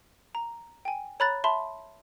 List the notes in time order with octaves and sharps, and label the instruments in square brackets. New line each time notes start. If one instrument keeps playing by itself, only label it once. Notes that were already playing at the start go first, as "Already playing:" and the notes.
[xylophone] A#5
G5 G#5
C#5 A#5 B5 F#6 A6
E5 A5 B5 C6